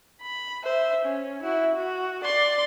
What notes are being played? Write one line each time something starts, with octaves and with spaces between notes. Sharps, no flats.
B5
C5 E5
C#4
E4 F#4
F#4
D5 C6